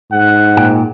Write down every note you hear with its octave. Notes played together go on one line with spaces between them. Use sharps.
G#2 F#5
A#2 G5 G#5